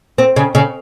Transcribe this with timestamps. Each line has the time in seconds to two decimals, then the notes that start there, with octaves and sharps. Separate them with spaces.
0.18 C4
0.36 C#3
0.55 C#3